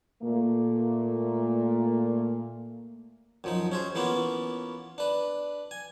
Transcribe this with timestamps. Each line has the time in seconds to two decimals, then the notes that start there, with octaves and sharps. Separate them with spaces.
0.23 A#2 A3 A#3
3.44 F#2 F3 D#4
3.72 C#4 G#4 C5
3.95 E3 A#3 B3 C#4 F4
4.98 D4 B4
5.71 G#5